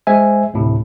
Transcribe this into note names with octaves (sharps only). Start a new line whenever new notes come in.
G#3 C5 E5 G#5
D2 A2 C3